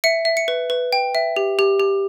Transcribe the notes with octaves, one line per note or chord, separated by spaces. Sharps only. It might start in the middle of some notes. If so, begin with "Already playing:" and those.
E5 C#7
E5
C#7
B4
B4
G5
E5
G4
G4
G4